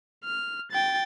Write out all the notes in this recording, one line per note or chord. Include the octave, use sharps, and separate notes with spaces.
F6
G5 A6